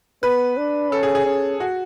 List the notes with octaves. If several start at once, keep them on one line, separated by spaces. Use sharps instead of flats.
B3 B4
D4
C#4 A4
G#4
G#4
C#4
F#4